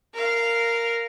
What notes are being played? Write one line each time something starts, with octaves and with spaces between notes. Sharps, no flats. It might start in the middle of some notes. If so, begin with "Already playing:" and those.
A#4 F5